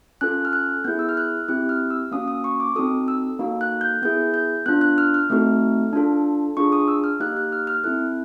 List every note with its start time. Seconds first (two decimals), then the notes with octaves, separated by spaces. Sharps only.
0.21 C#4 F4 A4 F#6
0.45 F6
0.53 F#6
0.85 B3 E4 G#4 G6
0.99 E6
1.09 F6
1.17 F#6
1.48 C4 E4 G4 F#6
1.69 F6
1.90 E6
2.12 A#3 C#4 F#4 D#6
2.28 D#6
2.44 C#6
2.60 D6
2.76 C4 D#4 F#4 A4 D#6
3.08 E6
3.39 A#3 D#4 F#4 A4
3.61 F#6
3.81 G6
4.02 B3 E4 G#4 G6
4.34 G6
4.66 B3 D4 F4 F#6
4.81 F#6
4.98 F6
5.14 F6
5.30 A3 C4 D#4 F#4 A4
5.93 D4 F4 A4
6.57 D4 F4 G#4 C#6
6.72 D#6
6.88 E6
7.04 F6
7.20 A#3 D#4 G4 F#6
7.37 F#6
7.52 F6
7.67 F6
7.84 C4 E4 A4 F#6